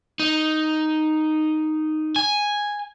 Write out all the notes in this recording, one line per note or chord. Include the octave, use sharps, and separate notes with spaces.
D#4
G#5